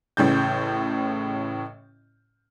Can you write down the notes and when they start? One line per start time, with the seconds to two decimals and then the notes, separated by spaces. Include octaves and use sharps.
0.17 A1 A2 C#3 G6